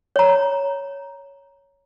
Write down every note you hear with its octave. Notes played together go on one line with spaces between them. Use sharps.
C#5 A#5